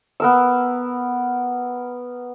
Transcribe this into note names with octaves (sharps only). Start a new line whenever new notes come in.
B3 A#4 E6